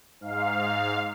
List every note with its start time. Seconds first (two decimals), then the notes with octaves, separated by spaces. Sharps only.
0.20 G#2 F5